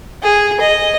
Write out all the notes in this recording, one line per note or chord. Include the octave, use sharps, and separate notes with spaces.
G#4
D#5